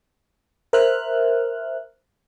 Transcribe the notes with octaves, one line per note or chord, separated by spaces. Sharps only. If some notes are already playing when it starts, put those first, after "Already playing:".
A#4 C5 E5 F6 F#6